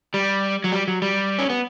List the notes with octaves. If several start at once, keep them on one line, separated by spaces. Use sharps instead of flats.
G3
F#3
G3
F#3
G3
C#4
B3